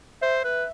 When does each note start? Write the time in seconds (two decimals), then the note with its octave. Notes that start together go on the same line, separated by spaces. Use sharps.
0.21 C5 E5
0.44 B4